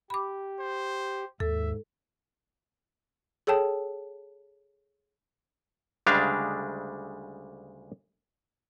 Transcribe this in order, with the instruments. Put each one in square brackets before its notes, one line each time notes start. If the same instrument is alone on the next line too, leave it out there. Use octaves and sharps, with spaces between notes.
[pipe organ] G4 [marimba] B5 D6
[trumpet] C5
[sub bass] D#2 [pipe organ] G#2 [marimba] A4 [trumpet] E5
[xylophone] G#4 A4 C#5 G5 A5
[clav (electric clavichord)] D2 C#3 G3 G#3 D4 F5